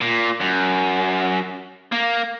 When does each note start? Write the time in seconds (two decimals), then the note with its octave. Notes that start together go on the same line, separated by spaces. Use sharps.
0.01 A#2
0.41 F#2
1.92 A#3